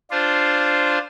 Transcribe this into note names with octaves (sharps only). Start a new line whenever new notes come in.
D4 F4 C5